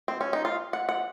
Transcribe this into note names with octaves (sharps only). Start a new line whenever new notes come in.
C4
C#4
D#4
F4
F#5
F#5